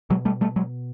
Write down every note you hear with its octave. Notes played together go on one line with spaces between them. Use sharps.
B2 F#3 G#3
G3 A3
G3 A3
F#3 G#3